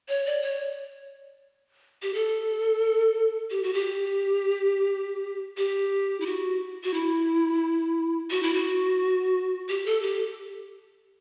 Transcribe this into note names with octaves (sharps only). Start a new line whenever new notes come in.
C#5
D5
C#5
G4
A4
G4
F#4
G4
G4
E4
F#4
F#4
E4
F#4
E4
F#4
G4
A4
G4